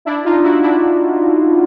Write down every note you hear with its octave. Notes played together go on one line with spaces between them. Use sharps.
D4 E4
D#4 F4
E4 F#4
D4 E4